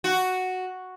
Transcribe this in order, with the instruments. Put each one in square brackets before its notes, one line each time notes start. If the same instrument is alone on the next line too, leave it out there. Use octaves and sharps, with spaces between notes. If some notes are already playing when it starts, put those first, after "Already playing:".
[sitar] F#4